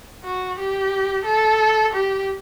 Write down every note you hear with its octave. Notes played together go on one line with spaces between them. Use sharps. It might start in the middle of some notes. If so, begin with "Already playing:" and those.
F#4
G4
A4
G4